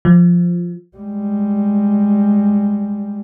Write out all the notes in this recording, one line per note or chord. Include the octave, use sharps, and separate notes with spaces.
F3
G3 G#3